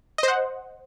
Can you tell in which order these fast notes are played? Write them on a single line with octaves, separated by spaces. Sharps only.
D#5 C5 F#5